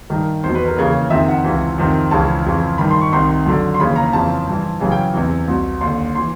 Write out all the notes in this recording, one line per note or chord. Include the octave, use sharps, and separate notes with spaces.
G2 D#3 A#4
E2 B2 C5
B4
A#4
D#2 C#3 E3
F2 C3 D#3 E5
F#5
C#2 C3 E3
F2 C3 D#3
C#2 C#3 E3 A5
F2 C#3 E3
G2 D#3 B5
C6
C#6
C2 C3 D#3 C6
F#2 D3
C6
D#2 C#3 E3 B5
A#5
F2 C#3 E3 A5
G2 E3
F#2 C#3 E3 G#5
G5
E2 C3 E3
C2 B2
D#2 D3 C6
E3 C6